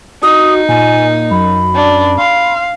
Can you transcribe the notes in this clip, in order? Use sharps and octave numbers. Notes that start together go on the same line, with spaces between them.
D#4 F#4 D#6
A#2 G#5
F#2 B5
D4
F5 C6